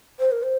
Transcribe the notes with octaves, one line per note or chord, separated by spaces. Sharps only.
C5
A#4
C5